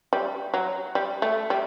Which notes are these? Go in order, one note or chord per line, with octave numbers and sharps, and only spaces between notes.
G3
F#3
G3
A3
G3